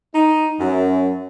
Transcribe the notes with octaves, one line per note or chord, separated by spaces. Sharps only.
D#4
F#2